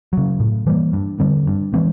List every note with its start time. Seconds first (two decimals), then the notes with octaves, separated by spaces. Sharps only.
0.13 C#3 F#3
0.40 A2
0.67 E3 G3 A#3
0.93 G2
1.20 D3 G3 C4
1.47 G2
1.74 E3 G#3 C4